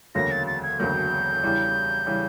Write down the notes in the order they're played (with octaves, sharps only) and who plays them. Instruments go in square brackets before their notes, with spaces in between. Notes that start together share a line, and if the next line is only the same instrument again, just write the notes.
[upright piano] E1 D2 C#3 F#3 A#3 [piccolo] A#6
[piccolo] A6
A6
G#6
[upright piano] E1 D2 C#3 F#3 A#3 [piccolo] G6
[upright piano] E2 C#3 E3 G3
C#3 E3 G3